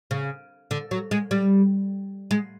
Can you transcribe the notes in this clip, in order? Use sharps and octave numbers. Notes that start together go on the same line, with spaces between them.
C#3
D3
F#3
G#3
G3
G#3